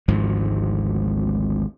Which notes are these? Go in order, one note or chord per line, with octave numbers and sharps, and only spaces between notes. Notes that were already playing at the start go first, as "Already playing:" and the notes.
G#1 D2 G#2 F3